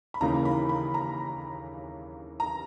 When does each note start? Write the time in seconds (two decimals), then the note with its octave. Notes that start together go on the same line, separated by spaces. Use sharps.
0.14 B5
0.21 D#2 C#3 E3 A#3 D#4 A#5
0.45 B5
0.69 B5
0.94 A#5
2.40 A#5